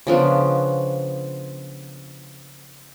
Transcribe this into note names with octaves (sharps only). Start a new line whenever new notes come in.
C#3 F3 B3 D4